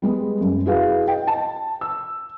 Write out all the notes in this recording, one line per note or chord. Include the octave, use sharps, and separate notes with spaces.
G3 G#3 B3
F#2
E4 F#4 G#4 B4 F5
D#5 G5
A5
E6